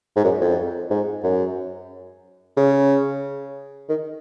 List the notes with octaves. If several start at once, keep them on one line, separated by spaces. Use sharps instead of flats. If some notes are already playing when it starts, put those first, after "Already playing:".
G#2
F#2
F2
G#2
F#2
C#3
D#3